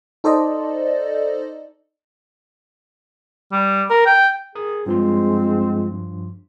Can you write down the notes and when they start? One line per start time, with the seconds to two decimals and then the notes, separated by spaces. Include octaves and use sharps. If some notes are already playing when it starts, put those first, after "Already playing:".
0.24 D#4 A4 C5 D5 D#5
3.52 G3
3.90 A#4
4.06 G5
4.55 G#4 A#4 D#6
4.86 G2 F3 G#3 C4 F4 C6